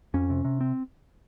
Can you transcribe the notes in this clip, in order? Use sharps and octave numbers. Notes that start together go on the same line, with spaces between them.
F2 C#4
C3
C3
C4